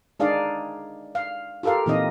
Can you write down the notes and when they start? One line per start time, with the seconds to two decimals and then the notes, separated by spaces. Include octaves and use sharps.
0.20 G#3 D4 D#4 G#4 D5 F5
1.15 F5
1.63 F4 G4 A4 A#4 F5
1.86 A#2 E3 F3 C4 D#4 D#5